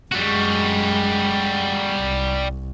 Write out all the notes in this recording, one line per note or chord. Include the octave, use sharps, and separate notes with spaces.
F#2 G3 G#3 F#4
C2